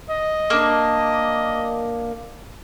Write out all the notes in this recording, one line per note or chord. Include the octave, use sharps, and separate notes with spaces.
D#5
A#3 D4